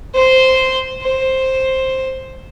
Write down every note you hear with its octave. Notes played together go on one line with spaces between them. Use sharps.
C5 C6
C5